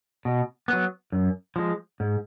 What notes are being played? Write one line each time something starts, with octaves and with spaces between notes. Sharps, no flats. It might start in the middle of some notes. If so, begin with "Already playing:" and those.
B2
F#3 B3
F#2
F3 G#3
G#2